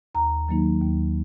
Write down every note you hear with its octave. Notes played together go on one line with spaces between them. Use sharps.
D#2 A#5
D#3 F#3 A#3 D#4
D#2